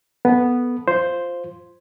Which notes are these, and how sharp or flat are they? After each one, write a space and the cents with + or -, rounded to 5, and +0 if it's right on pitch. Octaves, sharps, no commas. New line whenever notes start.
B3 -5 A4 -5
F4 +0 C5 +0